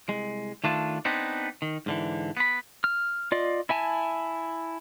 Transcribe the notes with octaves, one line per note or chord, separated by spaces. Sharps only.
C2 G#3
D#3 A3 D4 F4 A5
B3 C4 D4 D#4
D#3
G#2 D3 E3
B3 B5
F6
F4 D5 D#5
E4 E5 G#5 A5